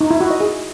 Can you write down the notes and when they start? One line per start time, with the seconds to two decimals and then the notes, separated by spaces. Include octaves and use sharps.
0.01 D#4
0.11 E4
0.21 F#4
0.31 D#5
0.40 G#4